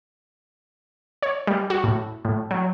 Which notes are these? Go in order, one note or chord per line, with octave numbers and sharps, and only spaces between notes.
C#5
G3
F#4
A2
A2
F#3